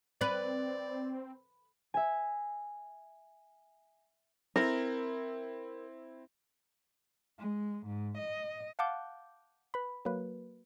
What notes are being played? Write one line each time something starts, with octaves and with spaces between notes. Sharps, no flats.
C4 B4 D5
E5 G#5
C4 E4 A#4
G#3
G#2
D#5
F5 F#5 A5 D6 G6
B4 B5
F#3 A#3 B4